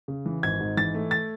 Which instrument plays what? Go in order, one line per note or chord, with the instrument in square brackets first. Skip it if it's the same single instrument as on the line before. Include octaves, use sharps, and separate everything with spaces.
[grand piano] C#3
E3
G#1 G#6
G#2
E3 A6
A3
A6